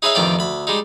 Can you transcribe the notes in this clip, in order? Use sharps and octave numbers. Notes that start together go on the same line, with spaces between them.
D#4 G#4 B4 C#5 E5 F5
A1 F2 D#3 F3 D5 G5
D2 B5
G3 G#3 D#4